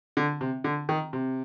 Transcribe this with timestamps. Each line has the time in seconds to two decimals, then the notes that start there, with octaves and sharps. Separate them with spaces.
0.17 D3
0.41 C3
0.64 D3
0.89 D#3
1.13 C3